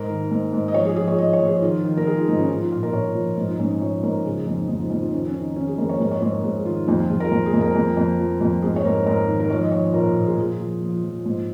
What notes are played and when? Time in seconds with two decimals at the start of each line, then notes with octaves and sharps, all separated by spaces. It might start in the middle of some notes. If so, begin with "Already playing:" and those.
Already playing: G#2 A#4
0.10 D#3
0.31 G#2
0.53 G#2
0.68 D#5
0.74 F3 C#5
0.85 G#4
0.96 F3 G#4
1.08 C#5
1.18 F3 D#5
1.33 C#5
1.40 F3
1.47 G#4
1.62 D#3 F4
1.84 D#3
1.97 A#4
2.06 D#3 G#4
2.17 F4
2.28 G#2 D#4
2.39 C#4
2.50 F3 D#4
2.61 F4
2.72 A#2 F4
2.83 A#4
2.93 A#2 C#5
3.15 F3
3.37 G#2 F4
3.48 D#4
3.59 G#2 C#4
3.70 D#4
3.82 F3 C#5
4.03 G#2 A#4
4.25 C#3 G#4
4.47 F2 D#4
4.68 F2 D#4
4.80 F4
4.90 F2 F4
5.02 D#4
5.12 D#3 C#4
5.27 C#4
5.34 D#3
5.41 D#4
5.56 D#3 C#4
5.68 G#4
5.78 F2 A#4
5.89 C#5
6.00 G#2 A#4
6.11 C#5
6.22 G#2 C#5
6.33 A#4
6.44 G#2 G#4
6.65 D#3 F4
6.87 F2 D#4
6.98 F4
7.10 F2 G#4
7.20 A#4
7.31 F2 F4
7.46 G#4
7.54 F2
7.61 A#4
7.75 F2
7.97 F2
8.19 F3
8.41 F2
8.62 G#2 G#4
8.76 C#5
8.85 G#2 A#4
9.07 G#2 A#4
9.28 D#3
9.40 A#4
9.50 F3 C#5
9.62 D#5
9.72 F3 C#5
9.83 F4
9.94 A#2 A#4
10.16 A#2
10.27 G#4
10.38 F3
10.60 F3
10.82 F3
11.04 F3
11.25 G#2 F4